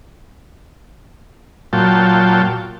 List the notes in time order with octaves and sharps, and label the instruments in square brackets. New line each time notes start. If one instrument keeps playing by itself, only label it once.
[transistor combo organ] A#2 F#3 F4 G5 A5